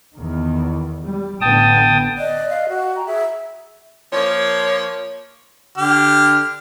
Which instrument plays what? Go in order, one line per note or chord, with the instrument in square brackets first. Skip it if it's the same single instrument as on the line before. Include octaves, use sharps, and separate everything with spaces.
[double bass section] E2 D#3
G3
[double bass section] A1 D3 B3 [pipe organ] G5 A5 D#6
[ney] D5 [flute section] D#5 F#6
[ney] F5
F#4
[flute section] G5 A#5
[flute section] G#4 [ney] E5
[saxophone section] F3 A#3 C#5
[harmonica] D3 G4 F6